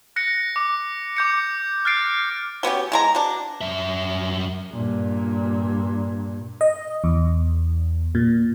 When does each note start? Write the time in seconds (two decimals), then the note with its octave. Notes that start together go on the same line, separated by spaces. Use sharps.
0.16 F#6 A#6 C#7
0.56 D6
1.17 D6 G6 C#7
1.85 F6 F#6 A6 C7 D7
2.63 F#3 B3 C#4 G4
2.92 E3 G#3 A#5
3.15 B2 D4
3.61 F#2 E5
4.71 G2 A#2
6.61 D#5
7.04 E2
8.15 A#2